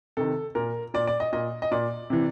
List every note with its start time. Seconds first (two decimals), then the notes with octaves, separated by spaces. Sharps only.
0.17 C3 D#3 A4
0.55 A#2 A#4
0.94 A#2 D5
1.07 D5
1.20 D#5
1.33 A#2 D#5
1.62 D#5
1.71 A#2 D5
2.10 C3 E3